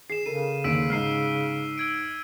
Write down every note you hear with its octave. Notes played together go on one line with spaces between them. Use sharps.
G#4 C7 E7
C#3 A4 A#4 D#7
D#2 D3 E6 B6 D7
G#2 D#4 F6 C7 D#7
E6 G#6 D7